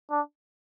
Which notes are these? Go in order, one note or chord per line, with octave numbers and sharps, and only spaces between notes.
D4